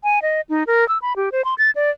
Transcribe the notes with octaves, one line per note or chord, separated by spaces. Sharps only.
G#5
D#5
D#4
A#4
E6
B5
G4
C5
C6
A6
D5